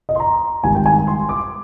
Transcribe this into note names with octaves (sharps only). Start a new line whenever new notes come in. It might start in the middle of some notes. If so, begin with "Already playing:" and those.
D#5
C6
A#5
G#1 G#2 D#3 G3 G#5
G5
G#5
C6
D6